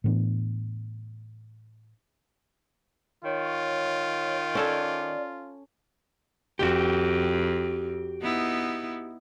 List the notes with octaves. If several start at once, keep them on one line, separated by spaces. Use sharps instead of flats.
A2 E3 B3 D4
D#3 F4 C#5
C#4 A4 C#5 D5
F2 F#4 G4
B3 D#4 E4